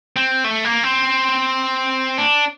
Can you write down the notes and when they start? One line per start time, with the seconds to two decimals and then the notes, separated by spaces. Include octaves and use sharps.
0.16 C4
0.44 A3
0.65 A#3
0.84 C4
2.18 D4